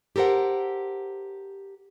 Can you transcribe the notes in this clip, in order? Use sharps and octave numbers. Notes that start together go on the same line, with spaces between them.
G4 A4 A#4 C5 F#5